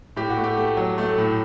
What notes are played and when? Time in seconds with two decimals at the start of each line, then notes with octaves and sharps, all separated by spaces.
0.16 A2 G4
0.30 F#4
0.37 A3
0.44 G4
0.57 A3
0.77 F#3
0.98 A3
1.18 A2